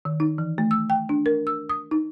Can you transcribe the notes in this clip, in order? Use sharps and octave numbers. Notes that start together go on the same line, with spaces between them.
D#3
D#4
E3
A3
E6
G5
D4
A#4
E6
D#6
D#4